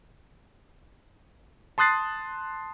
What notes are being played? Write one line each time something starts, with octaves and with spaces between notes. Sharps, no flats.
A5 C6 D#6 F#6 A6 C7